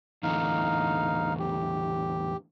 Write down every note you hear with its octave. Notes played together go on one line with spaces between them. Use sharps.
E2 A2 D3 D#4 F5
G4